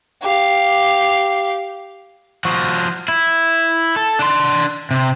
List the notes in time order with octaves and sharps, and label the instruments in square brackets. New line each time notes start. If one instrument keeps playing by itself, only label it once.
[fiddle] G4 F5
[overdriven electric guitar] F3 F#4
E4
A4
D4 C6
C3